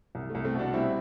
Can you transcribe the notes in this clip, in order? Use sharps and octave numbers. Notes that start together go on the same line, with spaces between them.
C2
A3
C2
A3 C4
B2
D4 F#4
G3 C4 E4